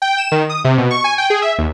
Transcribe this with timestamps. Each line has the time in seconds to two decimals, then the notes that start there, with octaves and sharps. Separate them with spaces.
0.02 G5
0.18 E7
0.32 D#3
0.49 D#6
0.64 C3
0.78 B2
0.91 C#6
1.04 G#5
1.18 G5
1.30 G#4
1.42 E5
1.58 D#2